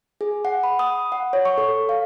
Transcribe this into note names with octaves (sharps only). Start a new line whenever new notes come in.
G#4
F#5
B5
D#6
F#5
C#5
C#6
A4
F5